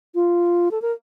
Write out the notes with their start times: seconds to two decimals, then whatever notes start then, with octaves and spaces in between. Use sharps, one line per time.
0.15 F4
0.71 A4
0.82 A#4